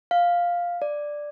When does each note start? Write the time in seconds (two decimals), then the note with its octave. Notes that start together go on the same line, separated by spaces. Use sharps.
0.11 F5
0.82 D5